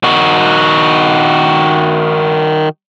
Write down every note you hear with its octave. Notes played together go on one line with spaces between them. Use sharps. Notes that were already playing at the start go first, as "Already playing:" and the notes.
D#3 F#4